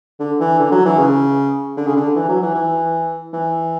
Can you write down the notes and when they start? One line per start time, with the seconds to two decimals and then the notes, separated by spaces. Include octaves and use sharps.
0.20 D3
0.40 E3
0.59 D3
0.72 F#3
0.86 E3
0.98 C#3
1.77 D3
1.87 C#3
1.96 D3
2.16 E3
2.29 F#3
2.42 E3
2.54 E3
3.33 E3